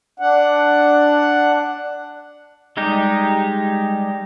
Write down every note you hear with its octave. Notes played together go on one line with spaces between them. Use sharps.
D4 F#5
G3 G#3 D#4 G4